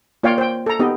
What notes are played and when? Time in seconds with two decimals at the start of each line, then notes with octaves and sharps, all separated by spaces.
0.23 A#3 F4 C#5 D5 F5 G5
0.38 C5 G5
0.66 A4 A#5
0.80 B3 D#4 G4 D#5